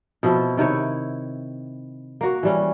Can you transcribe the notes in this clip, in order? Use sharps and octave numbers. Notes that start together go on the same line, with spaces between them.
B2 F3 C4 E4
C3 D#3 E4 C#5
A#3 F#4
E3 G3 C#4